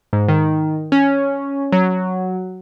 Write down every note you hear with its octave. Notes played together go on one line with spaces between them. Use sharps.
G#2
D#3
C#4
F#3